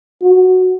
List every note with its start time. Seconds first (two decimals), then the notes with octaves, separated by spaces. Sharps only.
0.22 F#4